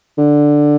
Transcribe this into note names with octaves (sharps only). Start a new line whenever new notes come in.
D3